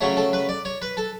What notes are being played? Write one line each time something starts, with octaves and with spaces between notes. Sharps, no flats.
C#3 F#3 A3 C#5
A4
B4
D5
C#5
B4
A4